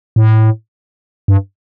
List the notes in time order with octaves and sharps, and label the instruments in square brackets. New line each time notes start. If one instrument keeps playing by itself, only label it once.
[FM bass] A2
G2